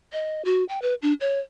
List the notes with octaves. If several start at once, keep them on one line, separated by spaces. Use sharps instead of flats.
D#5
F#4
G5
B4
D4
C#5